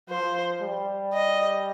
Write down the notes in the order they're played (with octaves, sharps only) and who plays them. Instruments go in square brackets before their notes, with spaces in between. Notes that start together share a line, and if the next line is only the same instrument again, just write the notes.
[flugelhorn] F3 [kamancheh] C5
[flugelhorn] G3
[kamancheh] D#5